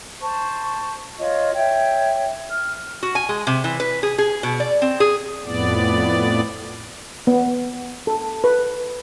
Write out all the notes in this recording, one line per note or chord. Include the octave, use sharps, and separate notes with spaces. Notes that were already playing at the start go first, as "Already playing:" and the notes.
C5 A5 C#6
F4 C#5 D#5
C#5 E5 G5
F6
F#4
G#5
G#3
C3
E3
B4
G#4
G#4
B2
D5
C4
G#4
F2 A2 B3 D5
B3
A4
B4